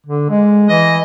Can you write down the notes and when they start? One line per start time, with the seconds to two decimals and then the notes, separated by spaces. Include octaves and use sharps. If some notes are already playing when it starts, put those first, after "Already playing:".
0.06 D3
0.29 G#3
0.69 E3 D#5